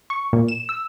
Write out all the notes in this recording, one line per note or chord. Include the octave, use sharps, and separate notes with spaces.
C#6
A#2
E7
E6